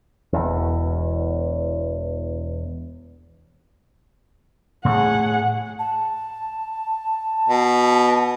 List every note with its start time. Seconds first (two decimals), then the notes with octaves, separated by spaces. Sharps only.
0.33 E1 E2
4.85 A2 A3 G#4 F#5
5.79 A5
7.49 B2